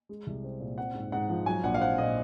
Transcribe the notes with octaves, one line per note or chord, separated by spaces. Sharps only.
G#3
C2
C4
A#2
C4 F#5
G#2
G#2 F#5
F3
F#3 G#5
A#1 F#5
F5
C4 F#5
A#2 D#5